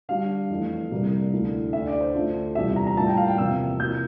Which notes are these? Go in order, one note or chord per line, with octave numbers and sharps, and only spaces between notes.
D3 G3 D4 F5
F2 E3 A3
C2 C3 G3 A#3
D2 D3 A3 E4
D2 D3 A3 E5
D5
C5
D2 D3 A3 D4 F4
E2 C3 G3 D4 F4 E5
A#5
A#5
A2 G3 A#3 D4 F4 A5
G5
F5
G5
E2 C3 F3 A#3 E6
C3 F3 A#3 E4 G6